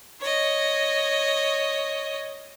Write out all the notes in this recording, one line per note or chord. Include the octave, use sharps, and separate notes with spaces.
C#5 D#5